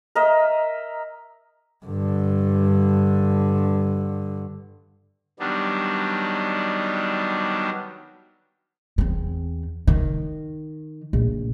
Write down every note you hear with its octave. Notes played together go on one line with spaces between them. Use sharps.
A#4 D#5 E5
G2 D3
D#3 F#3 G3 B3 D4
E2 C4
D#3
A#1